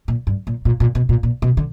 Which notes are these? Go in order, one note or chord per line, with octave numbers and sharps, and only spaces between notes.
A#2
G2
A#2
A#2
A#2
B2
A#2
A#2
B2
D3